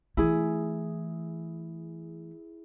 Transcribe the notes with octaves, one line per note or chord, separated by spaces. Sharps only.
E3 A3 E4 G#4